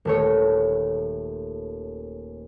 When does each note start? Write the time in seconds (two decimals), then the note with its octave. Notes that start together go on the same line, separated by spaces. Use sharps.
0.05 D#1 A3 C#5